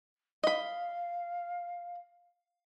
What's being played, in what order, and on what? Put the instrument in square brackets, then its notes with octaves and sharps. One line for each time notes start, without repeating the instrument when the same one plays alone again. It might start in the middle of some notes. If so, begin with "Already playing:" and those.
[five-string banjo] D#5 B5 [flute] F5